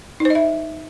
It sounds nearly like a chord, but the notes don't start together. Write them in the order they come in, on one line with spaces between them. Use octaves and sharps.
D#4 C5 D#5 E5